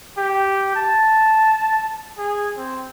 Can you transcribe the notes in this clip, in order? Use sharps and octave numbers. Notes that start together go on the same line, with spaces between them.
G4
A5
G#4
C4